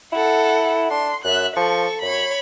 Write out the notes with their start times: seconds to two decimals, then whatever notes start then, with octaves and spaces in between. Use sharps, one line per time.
0.12 E4 A4 F#5
0.91 D4 C6
1.24 F#2 E5 F#6
1.57 F3 A4 C#6
2.02 F#2 C#5 B5